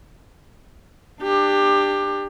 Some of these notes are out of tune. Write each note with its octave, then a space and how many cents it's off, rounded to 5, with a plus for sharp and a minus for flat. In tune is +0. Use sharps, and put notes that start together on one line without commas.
D4 +25 G4 +15